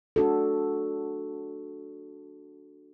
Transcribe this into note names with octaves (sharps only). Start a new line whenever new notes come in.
D4 F#4 A4